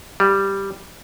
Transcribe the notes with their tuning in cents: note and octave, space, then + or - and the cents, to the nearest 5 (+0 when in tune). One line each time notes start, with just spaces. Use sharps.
G3 +0